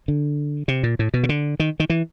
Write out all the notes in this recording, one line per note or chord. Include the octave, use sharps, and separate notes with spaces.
D3
C3
A#2
A2
B2
C#3
D3
D#3
D#3
E3